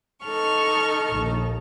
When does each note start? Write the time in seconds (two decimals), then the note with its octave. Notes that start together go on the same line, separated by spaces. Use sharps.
0.24 D#4 A4 C#6 F6
1.10 A#1 D#2